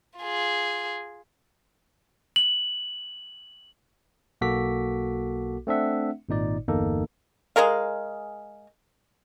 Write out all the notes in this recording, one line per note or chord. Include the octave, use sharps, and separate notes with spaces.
F4 G#4
F#7
B1 A#3 F#4 A4 D6 B6
A3 C4 D4 E5 F#5
G#1 A#2 D#4 D5
G1 E2 A#3 D#4 A4
G#3 G#4 A#4 F5